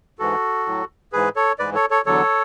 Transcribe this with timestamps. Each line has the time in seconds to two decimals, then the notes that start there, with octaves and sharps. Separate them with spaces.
0.19 G#2 E3 F#4 A4
0.66 A2 F#3
1.13 G#2 E3 G#4 B4
1.36 A4 C#5
1.59 G#2 E3 B4 D5
1.75 A4 C#5
1.90 A4 C#5
2.06 E2 D3 F#3 A4 C#5